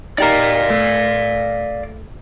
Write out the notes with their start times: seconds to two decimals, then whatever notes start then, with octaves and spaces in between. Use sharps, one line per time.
0.18 D#4 G4 A#4 D5 F5
0.70 A3